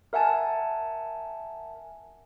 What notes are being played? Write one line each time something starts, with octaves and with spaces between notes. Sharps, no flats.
A#4 E5 F#5 G#5 A5